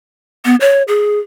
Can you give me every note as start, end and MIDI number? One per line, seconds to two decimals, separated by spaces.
0.45 0.56 59
0.61 0.83 73
0.88 1.19 68